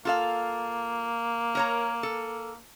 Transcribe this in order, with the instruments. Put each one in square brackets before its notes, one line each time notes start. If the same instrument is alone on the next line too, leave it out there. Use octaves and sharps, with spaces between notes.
[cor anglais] A#3 [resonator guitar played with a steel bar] F4 A4 F5
[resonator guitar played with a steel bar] A#4 C#5 A#5
A4